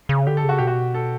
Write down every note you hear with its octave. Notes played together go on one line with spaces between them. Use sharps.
C#3
D3 G4
A4
C#3
F#4
B2 G4
F#4
A4